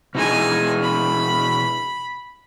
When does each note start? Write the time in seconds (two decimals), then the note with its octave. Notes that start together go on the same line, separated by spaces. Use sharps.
0.15 B2 D#4 E4 G#4 G#5
0.82 B5